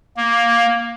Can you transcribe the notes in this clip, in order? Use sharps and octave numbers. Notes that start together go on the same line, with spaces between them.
A#3